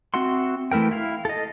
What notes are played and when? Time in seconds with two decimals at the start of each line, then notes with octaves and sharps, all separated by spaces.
0.14 C4 F#4 E5 F#5 C6
0.72 E3 A3 E4 A#4 G5
0.91 E4 F5
1.25 A4 D#5